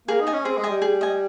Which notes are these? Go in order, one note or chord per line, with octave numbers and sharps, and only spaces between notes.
A#3 G#4
D#4
D#5 G#5
C#4
C4 G#4
G#3
D#5 G#5
G3
G#4
D#5 G#5